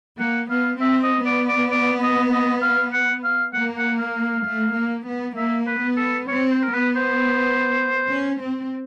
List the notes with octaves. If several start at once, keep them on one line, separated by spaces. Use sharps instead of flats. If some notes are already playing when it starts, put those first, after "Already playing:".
A#3 F#5
B3 F5
C4 E5
D#5
B3 D5
D5
D5
D#5
D#5
F5
F#5
F5
A#3 F#5
F#5
F5
A3
A#3
B3
A#3 E5
B4
B3
A4
C4 C#5
C5
A#4
B3 B4
C5
C#4
C4